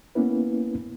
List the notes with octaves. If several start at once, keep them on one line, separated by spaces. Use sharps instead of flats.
A#3 B3 C#4 E4 B4